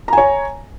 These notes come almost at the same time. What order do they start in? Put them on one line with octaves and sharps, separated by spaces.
A#5 G#5 C#5